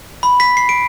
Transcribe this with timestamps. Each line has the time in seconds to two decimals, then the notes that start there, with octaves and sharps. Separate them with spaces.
0.23 B5
0.40 B6
0.57 C7
0.69 D7